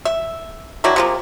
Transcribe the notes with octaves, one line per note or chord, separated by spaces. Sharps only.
E5
D#3 F#3 D4 E4
C3 F3 A#3